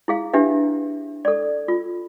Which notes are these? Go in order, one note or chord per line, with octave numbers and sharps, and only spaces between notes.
E4 G#4 F5
D4 E4 G4 B4 E5
A4 D5
F4